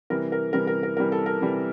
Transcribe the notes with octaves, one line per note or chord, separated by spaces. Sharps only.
C3 E3 G3 A#4
A#4
C3 E3 G3 A#4
A#4
A#4
C3 E3 G3 A#4
A4
A#4
C3 E3 G3